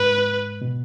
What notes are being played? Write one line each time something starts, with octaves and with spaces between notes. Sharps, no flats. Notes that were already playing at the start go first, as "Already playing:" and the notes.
Already playing: G#2 B4
B2